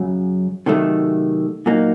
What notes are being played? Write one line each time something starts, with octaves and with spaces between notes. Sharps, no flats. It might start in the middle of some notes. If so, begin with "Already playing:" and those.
Already playing: F#2 C#3 F#3
C3 D#3 F#3 A3
A#2 F#3 A#3 D#4